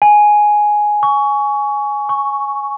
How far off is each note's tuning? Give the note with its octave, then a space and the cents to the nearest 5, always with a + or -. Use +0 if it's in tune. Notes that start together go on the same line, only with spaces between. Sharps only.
G#5 +5
C#6 +20
C#6 +0